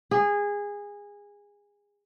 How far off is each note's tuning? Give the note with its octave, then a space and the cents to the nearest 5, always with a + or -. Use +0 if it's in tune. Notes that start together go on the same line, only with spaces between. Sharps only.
G#4 -20